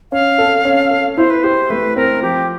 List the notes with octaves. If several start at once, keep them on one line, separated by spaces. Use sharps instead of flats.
C#4 F5
A4
C#4
A4
E4 C5
B4
G4 C5
A3 B4
C4 A#4
F3 G4